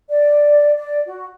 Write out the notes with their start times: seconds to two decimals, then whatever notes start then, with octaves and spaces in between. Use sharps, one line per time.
0.10 D5
0.76 D5
1.07 F#4